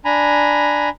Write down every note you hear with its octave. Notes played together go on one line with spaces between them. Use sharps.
D4 G#5 A#5 B5